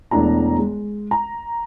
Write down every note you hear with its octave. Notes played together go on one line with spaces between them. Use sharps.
E1 E2 A3 D4 E4 A#5
G#3
A#5